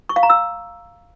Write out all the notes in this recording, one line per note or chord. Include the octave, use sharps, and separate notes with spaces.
C#6
F5
A#5
E6